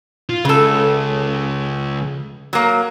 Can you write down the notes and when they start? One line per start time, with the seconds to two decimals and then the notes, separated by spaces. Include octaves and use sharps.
0.29 F4
0.45 C#2 C#3 A4
2.53 F#3 A#3